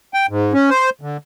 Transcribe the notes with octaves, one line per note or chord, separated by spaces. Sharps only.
G5
G#2
C#4
C5
D3